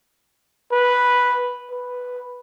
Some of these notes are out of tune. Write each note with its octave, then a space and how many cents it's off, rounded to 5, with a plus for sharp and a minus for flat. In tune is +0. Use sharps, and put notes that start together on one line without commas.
B4 -5
B4 +0